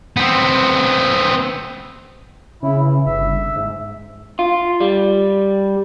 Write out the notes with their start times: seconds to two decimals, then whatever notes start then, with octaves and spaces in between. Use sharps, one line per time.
0.17 B3 C4
2.63 C#3 E4
2.81 E3
3.06 G1 E5
3.56 G#2
4.39 F4
4.80 G3